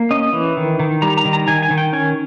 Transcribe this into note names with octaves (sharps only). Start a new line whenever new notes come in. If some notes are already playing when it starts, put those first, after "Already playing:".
Already playing: A#3
C#4 D#5
E3
D#3
D#3
G3 A#5
A#5
D#3
A#5
D#3 G#5
G#5
D#3
G5
C#4 G#5